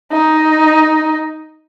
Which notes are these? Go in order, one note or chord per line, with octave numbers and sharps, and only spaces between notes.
D#4